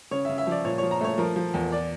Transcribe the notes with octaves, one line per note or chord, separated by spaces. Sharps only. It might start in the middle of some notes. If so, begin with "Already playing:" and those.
C#3 C#5
E5
C#3
E5
F3 D5
A#2 C#5
C#5
F3
A#5
A3 C#5
F3 A#4
F3
E2
D5